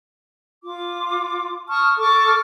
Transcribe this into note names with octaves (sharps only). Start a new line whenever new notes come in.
F4 D6
A5 C#6 D#6 F6
A4 C#6 D6 F6